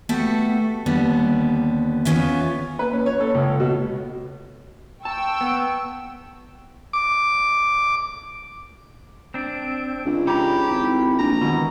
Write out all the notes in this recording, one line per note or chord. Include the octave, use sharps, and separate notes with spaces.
A3 B3 F#4 G4 A4
D#2 D3 G3 B3
E2 A#2 B3 C#4 F4 E5
B4
C#4
C#5
A4
C#2
B2
G5 A5 C#6 E6
B3
D6
C4 D4 D7
C#2 D4
D#4 G4 C#5 A#5 B5
G#1 E4
A#1 A#5
B2 D#3 E3 G#3